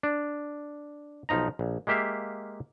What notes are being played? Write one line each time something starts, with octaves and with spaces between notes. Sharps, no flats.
D4
B1 F3 D#4 A#5
A#1
G#3 A#3 G4 E5 F5